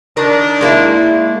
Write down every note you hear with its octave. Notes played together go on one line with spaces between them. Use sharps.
D#3 D4 A#4
G#3 A#3 E4